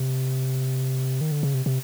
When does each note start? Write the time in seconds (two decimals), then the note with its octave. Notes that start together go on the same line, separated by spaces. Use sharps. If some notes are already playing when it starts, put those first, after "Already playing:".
Already playing: C3
1.21 D#3
1.31 D3
1.43 C#3
1.54 C3
1.66 C3